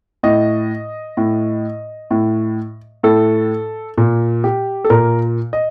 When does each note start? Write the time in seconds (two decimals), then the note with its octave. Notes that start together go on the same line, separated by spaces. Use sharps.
0.23 A2 D#5
1.17 A2
2.11 A2
3.03 A2 A4
3.98 A#2
4.44 G4
4.85 A4
4.90 A#2 A#4
5.53 D#5